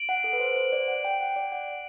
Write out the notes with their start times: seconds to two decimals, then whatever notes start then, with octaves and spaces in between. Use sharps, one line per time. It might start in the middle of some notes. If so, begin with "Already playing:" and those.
Already playing: D7 F#7
0.09 F#5
0.24 A4
0.33 B4
0.40 C5
0.56 C5
0.72 D5
0.88 F#5
1.04 G5
1.21 F#5
1.36 D5
1.52 F#5